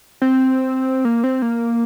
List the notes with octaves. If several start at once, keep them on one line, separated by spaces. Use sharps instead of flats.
C4
A#3
C4
A#3